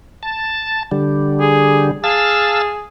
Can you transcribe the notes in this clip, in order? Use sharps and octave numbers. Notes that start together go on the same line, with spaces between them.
A5
D3 G3
G#4
G#4 F5 A5 E6